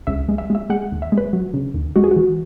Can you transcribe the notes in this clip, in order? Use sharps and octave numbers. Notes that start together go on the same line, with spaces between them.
C#2 E5
G#3
E5
G#3 E5
G#3 F#5
D#2
E5
G#3
B4
F#3
C#3
D#2
G#3 F#4
G#4
F#4
E3